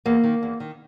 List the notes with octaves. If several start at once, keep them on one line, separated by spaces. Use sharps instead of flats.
E2 A#3
D#3
E2
D#3